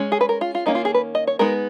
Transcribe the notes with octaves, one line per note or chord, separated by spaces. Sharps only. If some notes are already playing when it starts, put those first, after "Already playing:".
Already playing: G#3 C#4
G#4
B4
A#4
F4
F4
D#3 A#3 C#4 D#4
F4
G#4
B4
D#5
C#5
G#3 B3 D#4 A#4